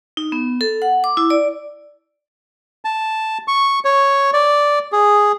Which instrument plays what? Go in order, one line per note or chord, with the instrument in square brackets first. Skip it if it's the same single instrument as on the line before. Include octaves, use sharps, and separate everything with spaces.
[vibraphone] D#4
B3
A4
F#5
D6
E4
D5
[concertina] A5
C#6
C#5
D5
G#4